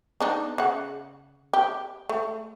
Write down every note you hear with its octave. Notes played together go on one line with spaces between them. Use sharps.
B3 D4 D#4
C#3 F#5
G4
A3